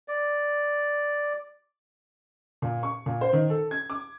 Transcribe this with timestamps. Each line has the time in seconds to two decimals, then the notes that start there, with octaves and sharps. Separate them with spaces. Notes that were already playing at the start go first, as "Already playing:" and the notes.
0.08 D5
2.62 A#2
2.83 C#6
3.06 A#2
3.21 C5
3.33 D#3
3.50 A4
3.71 G#6
3.90 D6